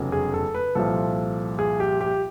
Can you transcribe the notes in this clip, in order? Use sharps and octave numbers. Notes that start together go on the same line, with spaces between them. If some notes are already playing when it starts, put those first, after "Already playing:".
Already playing: F1 E2 C#3 F#3
G#4
A4
B4
C2 A#2 F3 A4
G#4
G4
G4